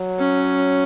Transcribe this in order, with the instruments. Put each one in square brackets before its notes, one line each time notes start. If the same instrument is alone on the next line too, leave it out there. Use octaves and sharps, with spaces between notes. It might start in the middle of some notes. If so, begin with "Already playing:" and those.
Already playing: [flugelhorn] F#3
[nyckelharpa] C#4